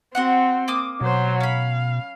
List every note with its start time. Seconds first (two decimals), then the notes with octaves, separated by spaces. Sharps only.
0.15 C4 F#4 C5 F#5
0.68 A#3 D6 D#6
1.01 B2 F#3 C5
1.40 C#4 F5 B5